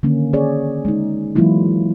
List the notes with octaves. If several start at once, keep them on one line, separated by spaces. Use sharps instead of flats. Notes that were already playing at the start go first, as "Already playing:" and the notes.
D3 D#3 A#3 C#4
C#4 G#4 C#5 D5
G#3 D#4
E3 F#3 G#3 A#3 E4 F4